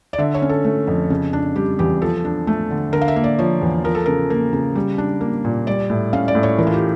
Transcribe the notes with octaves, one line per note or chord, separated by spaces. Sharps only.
D5
D3 E5
C#5
C#4
A4
A3
F2
C#3
D4
G3 G4
E2 G4
F3 A4
D4
A3
D3
D3 A#4
F5
E5
A#3
D5
F3 C#5
E2
F3 A#4
A4
C#3 A#4
A#3
C#3
G3
D4
A#3
A#2
G3 D5
A2
C#4 F5
D5
A2
C#5
E3 A#4
F4
G4